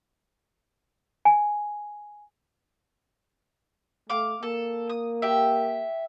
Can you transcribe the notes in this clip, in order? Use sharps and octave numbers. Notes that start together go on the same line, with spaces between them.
G#5
A3 F5 D6
A#3 A4
D#6
G4 E5